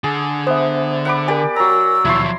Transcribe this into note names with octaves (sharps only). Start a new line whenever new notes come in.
D3 G#4
B3 C5 E5
F#5 B5 D6
G4 A#4 D5 G#5
F#3 A#5 E6
D#2 B2 F3 F#3 E4 C6 C#6